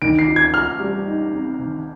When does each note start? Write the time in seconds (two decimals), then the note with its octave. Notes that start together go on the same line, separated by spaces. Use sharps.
0.02 D#3 D7
0.19 C7
0.27 F4
0.36 G#6
0.54 F4 F6
0.80 G3
1.07 D#4
1.33 C4
1.59 D#3